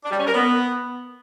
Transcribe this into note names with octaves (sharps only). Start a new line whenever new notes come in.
D4
G3
C#4
A#4
B3